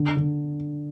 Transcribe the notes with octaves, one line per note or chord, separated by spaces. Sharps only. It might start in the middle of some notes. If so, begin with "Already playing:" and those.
Already playing: D3
D3